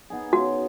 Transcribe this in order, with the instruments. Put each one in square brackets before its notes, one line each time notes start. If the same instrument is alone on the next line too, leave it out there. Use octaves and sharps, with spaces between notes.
[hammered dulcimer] B3 D#4 G#4
[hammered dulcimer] C#3 [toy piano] F#4